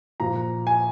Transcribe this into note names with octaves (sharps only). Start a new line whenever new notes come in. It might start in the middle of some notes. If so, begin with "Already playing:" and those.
A#2 F3 A#5
G#5